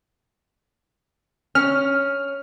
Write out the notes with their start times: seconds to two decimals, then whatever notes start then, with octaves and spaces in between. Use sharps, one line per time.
1.55 C#4 F6